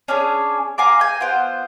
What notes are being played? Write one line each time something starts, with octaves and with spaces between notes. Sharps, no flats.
C#4 D4 G#4 C#5
F5 G#5 A#5 D6
G5 G#5
B3 F4 C5 G5